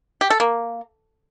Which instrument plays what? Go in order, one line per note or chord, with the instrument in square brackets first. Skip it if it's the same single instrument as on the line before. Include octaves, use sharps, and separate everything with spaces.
[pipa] G4
A4
A#3